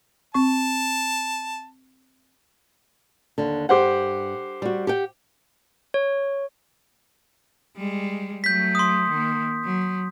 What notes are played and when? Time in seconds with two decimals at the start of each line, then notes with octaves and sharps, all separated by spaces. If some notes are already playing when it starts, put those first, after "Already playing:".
0.34 C4 A5 C#6
3.38 D#2 D3
3.69 G2 G4 C5 F#5
4.62 G3 F#4
4.87 G4 F#5 G5
5.94 C#5
7.77 G3 G#3
8.44 F#3 A3 G6 B6
8.75 C6 D#6
9.10 D#3 A#3
9.64 F#3